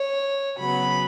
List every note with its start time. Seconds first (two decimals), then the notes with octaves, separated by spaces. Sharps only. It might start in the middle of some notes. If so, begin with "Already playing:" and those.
Already playing: C#5
0.58 C#3 F#3 B3 B5